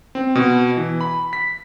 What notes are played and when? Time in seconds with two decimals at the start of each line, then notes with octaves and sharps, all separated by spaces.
0.15 C4
0.35 B2
0.77 E3
1.01 B5
1.33 B6